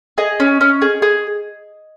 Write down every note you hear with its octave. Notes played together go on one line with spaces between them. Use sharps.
G#4 D#5
C#4
C#4
G#4
G#4